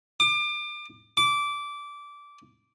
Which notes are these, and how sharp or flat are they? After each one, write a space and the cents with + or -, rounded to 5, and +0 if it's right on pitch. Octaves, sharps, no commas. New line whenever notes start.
D6 +30
D6 -15